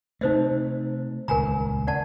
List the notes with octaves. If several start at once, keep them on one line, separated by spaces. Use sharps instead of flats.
C3 A3 D#4 C5 D#5
D#1 C#2 A#4 G#5 A#5
D5 F#5 A5